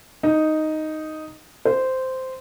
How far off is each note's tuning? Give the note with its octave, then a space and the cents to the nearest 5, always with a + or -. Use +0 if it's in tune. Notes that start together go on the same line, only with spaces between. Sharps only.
D#4 +0
C5 -10